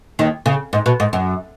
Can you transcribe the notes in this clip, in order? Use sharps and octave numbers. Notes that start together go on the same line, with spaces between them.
D#2 D#3
C#3
G#2
B2
G#2
F#2